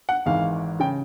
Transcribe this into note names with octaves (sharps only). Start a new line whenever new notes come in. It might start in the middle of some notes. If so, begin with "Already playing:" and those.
F#5
G#1 G#2 E3 F5
C#3 G5